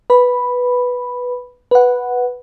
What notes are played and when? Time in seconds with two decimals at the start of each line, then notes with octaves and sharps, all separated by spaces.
0.10 B4 B5
1.71 B4 F#5